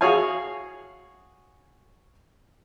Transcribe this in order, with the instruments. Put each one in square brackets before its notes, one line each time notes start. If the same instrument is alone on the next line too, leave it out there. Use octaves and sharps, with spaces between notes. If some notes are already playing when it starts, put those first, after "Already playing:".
[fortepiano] F#4 G#4 C#5 F5 G#5